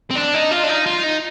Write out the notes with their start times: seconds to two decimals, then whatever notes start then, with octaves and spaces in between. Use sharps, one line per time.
0.10 C4
0.15 D4
0.34 D#4
0.51 F4
0.64 D4
0.69 D#4
0.86 F4
1.03 D#4